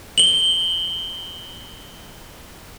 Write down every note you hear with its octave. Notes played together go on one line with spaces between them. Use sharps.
F#7 G7